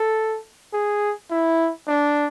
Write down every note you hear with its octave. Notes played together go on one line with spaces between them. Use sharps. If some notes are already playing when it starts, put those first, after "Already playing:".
Already playing: A4
G#4
E4
D4